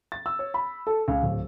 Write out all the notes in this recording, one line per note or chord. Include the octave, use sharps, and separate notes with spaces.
A6
E6
C#5
B5
A4
C#2
D1